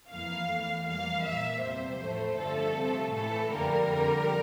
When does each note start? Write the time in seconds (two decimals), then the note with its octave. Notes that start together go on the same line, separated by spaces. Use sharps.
0.09 F2 E3 A#3 F5
0.47 E2 E3 A3
0.86 F2 E3 G3 A#3 F5
1.23 A#2 G3 A#3 E5
1.62 E2 C3 G3 C5
2.00 A2 F3 A3
2.37 G2 D3 F3 A3 A4
2.76 C3 F3 A3
3.13 A2 E3 A3 A4
3.52 F2 D3 G3 A#3 A#4
3.90 F2 D3 G3